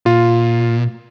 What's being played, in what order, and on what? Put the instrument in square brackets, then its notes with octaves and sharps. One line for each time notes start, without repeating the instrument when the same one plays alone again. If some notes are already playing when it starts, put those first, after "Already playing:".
[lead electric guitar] A#2 [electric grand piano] F4